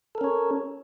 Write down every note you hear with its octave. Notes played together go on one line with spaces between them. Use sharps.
C#4 A4 A#4 C#5